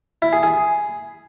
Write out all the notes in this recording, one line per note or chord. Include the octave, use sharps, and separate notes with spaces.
E4
G#4
G#4